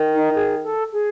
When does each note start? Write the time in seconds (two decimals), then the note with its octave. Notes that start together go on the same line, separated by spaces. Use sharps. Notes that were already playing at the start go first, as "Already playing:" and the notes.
Already playing: D#3
0.14 D#4
0.35 G#4
0.63 A4
0.92 G#4